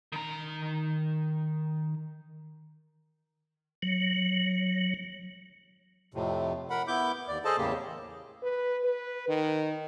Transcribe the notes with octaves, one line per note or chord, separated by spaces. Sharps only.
D#3 A#5
F#3
F2 A2 C3
A#4 F#5 B5
B3 E4 D6 G6
D#2 D5
G#4 A4 C5 D#5 A5
E2 A2 C#3 A#3 G4
B4
B4
D#3